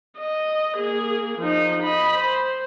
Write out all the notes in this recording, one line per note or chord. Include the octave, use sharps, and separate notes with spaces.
D#5
A#3 G#4
F3 D#4
D#5 B5
C5